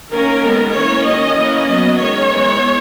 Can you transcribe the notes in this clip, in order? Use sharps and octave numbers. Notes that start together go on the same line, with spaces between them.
D#3 A#3 C#4 A#4
D#3 G#3 B3
E3 A#3 C#4 C#5
D#3 F#3 C#4 D#5
E3 A#3 C#4
F#3 B3 D#5
D#3 G#3 C#4 C#5
E3 G#3 B3